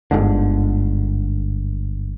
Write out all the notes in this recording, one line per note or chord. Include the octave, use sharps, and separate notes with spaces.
G1 G#2 D3